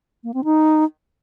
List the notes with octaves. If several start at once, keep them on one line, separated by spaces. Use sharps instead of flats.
A#3
C4
D#4